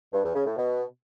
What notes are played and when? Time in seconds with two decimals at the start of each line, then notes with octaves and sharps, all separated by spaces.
0.13 G2
0.24 E2
0.35 C#3
0.46 A2
0.57 B2